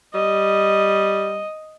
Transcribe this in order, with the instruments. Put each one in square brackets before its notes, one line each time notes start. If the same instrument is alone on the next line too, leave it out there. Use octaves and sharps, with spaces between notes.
[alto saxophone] G3 [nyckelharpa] D#5